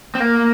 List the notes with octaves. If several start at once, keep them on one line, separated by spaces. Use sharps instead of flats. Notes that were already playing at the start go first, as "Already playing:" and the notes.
C4
A#3